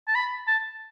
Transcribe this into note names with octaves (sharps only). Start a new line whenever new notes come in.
A5
B5
A5